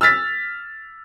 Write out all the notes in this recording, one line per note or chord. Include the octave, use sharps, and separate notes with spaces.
E6 F6 A6 B6